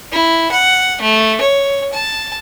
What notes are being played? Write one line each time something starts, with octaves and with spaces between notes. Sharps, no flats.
E4
F#5
A3
C#5
A5